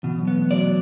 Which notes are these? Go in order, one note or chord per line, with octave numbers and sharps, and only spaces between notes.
B2 E3
F#3
B3
A3
F#3 D5
F#3